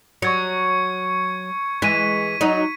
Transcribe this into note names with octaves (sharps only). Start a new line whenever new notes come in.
F#3 C#6 G#6 C#7
E3 G#3 B6 D#7
F#3 D#4 D#7